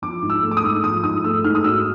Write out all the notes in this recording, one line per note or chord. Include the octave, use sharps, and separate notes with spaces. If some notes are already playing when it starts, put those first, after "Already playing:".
F3 D6
G#2
E6
A3
D6
D#6
G#2
F3 D#6
G#2 D#6
A3 E6
G#2 F6
D#6
F#3 E6